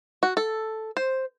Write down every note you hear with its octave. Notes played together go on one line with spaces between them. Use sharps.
F#4
A4
C5